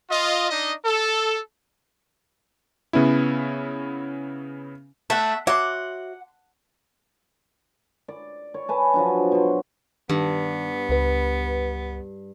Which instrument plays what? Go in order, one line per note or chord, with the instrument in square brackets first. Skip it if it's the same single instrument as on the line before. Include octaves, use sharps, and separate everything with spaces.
[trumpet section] F4 D#5
D4 D#4 D#5
A4
[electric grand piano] C#3 B3 C#4 E4
[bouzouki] A3 [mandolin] E5 F#5
[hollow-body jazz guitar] F#4 C#5 E5 [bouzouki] F#5 [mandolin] C6 D6
[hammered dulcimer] D5
C#5
B4 G#5 A5
F3 F#3 D4
B2 C6
[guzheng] G2 [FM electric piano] D#3 [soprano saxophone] B3
[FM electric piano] C#2 B4